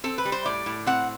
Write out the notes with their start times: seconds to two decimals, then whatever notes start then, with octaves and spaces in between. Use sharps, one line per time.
0.04 C4 A4
0.18 B4
0.25 G3
0.32 C5
0.45 A2 D5
0.66 A2
0.86 C4 F#5